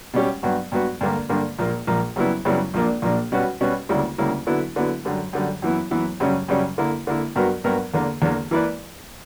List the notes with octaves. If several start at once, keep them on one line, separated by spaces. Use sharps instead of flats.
B2 G3 C#4 G4
G2 F#3 B3 F#4
G2 F#3 B3 F#4
G2 D3 A#3
G2 D3 A#3
A#1 A#2 A#3
A#1 A#2 A#3
F#2 C#3 G3 B3 E4
F#2 C#3 G3 B3 E4
A#1 A#2 A#3 D4
A#1 A#2 A#3 D4
B2 G3 C#4 F#4 B4
B2 G3 C#4 F#4 B4
D2 C#3 G3 A#3 E4
D2 C#3 G3 A#3 E4
D3 F#3 B3 E4
D3 F#3 B3 E4
F#2 D3 G3
F#2 D3 G3
F#2 E3 B3 E4
F#2 E3 B3 E4
F#2 C#3 G3 C#4
F#2 C#3 G3 C#4
D3 A#3 E4
D3 A#3 E4
G2 F#3 B3 F#4 A#4
G2 F#3 B3 F#4 A#4
E2 D3 A#3
E2 D3 A#3
E3 A#3 E4 B4 D5